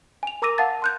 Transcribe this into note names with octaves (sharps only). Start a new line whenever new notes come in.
G#5 F7
A#4 A#5 D6 E6 A#6 D#7
F5 F#5 A5 A6
C6 F#6 G6